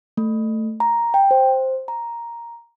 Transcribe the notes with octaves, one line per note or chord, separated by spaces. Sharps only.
A3
A#5
G5
C5
A#5